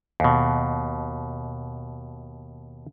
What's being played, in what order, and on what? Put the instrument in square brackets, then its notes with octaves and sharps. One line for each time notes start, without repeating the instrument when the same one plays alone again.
[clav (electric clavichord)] D#2 B2